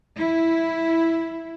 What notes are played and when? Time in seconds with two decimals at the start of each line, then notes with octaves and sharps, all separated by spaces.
0.18 E4